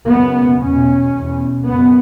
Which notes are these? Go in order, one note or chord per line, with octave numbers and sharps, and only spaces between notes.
F#2 C#3 B3
E2 B2 C#4
E2 B2
F#2 C#3 B3